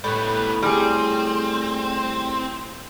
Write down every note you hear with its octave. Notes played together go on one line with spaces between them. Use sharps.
A2 G3 B3
G3 C4 G#4